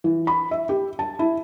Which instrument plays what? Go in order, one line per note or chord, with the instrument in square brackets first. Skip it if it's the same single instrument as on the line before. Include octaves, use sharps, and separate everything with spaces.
[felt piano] E3
B5
E5
G4
A5
E4